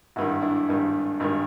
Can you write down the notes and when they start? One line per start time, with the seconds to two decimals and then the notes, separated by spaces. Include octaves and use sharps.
0.16 G#1 G2 D#3 E4 F#4
0.42 D4 E4
0.68 G#1 G2 D#3
1.20 G#1 G2 D#3